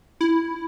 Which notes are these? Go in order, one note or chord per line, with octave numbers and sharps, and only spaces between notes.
E4